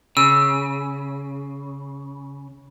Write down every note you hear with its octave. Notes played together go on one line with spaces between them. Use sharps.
C#3 E6